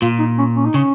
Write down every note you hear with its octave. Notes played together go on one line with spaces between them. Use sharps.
A#2 F4
D#4
C#4
C#4
D#4
C#3 C#4